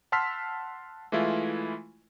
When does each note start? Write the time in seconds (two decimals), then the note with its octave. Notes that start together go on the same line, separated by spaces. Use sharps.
0.12 F#5 A5 C6 E6 F6 B6
1.12 E3 G#3 A3 E4 F4